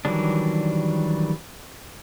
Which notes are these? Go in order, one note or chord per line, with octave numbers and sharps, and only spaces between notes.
D#3 E3 F#3 G3 D4